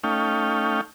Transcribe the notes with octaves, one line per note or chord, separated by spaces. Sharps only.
A3 C#4 D#4 F5 G5